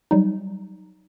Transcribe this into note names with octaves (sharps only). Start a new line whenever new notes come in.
F#3 G3 D#4